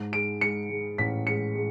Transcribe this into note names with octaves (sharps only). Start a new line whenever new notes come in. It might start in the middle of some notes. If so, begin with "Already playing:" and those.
Already playing: G#2
G#3 D7
G#3 C#7
G#3
A1 B6
G#3 C#7
G#3